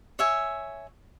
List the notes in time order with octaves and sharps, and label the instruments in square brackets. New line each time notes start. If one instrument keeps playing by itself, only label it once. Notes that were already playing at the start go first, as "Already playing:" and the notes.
[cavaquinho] C#5 E5 G#5